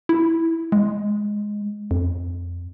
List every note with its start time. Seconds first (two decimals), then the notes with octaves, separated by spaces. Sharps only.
0.09 E4
0.72 G#3
1.91 F2